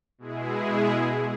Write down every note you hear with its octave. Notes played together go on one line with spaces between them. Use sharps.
B2 G#3 E4 G#4